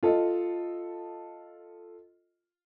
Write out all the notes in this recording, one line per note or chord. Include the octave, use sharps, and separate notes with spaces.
F4 A4 D#5